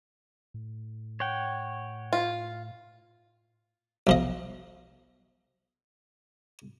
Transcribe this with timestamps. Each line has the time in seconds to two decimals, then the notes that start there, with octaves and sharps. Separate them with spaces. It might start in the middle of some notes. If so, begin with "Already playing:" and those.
0.54 A2
1.20 C#5 F#5 G5
2.13 F4
4.07 B1 F3 D#5